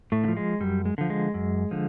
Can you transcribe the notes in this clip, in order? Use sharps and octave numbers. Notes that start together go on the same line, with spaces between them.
A2 A3
D3
F3
G#3
F#2 G3
G#3
D3 F3
G#3
F#2
D3 F3